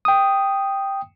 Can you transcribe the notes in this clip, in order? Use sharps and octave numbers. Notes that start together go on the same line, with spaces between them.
G5 D#6